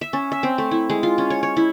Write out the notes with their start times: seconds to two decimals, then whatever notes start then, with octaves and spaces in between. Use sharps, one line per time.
0.01 E5
0.13 C#4
0.32 E5
0.43 C4
0.58 A3
0.71 E4
0.90 G#3
1.03 F4
1.18 C#4
1.30 C#5
1.43 C#5
1.57 E4